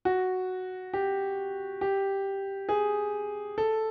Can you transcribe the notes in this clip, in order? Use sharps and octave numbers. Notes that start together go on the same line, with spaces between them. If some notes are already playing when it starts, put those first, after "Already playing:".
F#4
G4
G4
G#4
A4